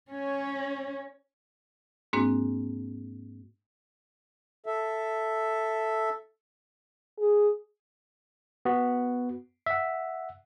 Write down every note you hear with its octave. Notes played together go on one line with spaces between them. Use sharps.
C#4 C#5
G#2 G#3 A#3 C4 D4 F#4
A4 E5
G#4
B3 F#4
E5 F#5